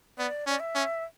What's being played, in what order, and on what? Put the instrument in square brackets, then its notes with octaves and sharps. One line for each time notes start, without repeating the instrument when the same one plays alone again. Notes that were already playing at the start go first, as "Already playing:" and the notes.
[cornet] B3 [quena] D5
[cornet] C#4 [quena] D5
[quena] E5
[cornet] C#4